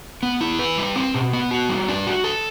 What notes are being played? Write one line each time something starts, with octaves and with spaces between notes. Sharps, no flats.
B3
E4
B4
G3
C4
B2
B3
F#4
G3
D4
F#4
A4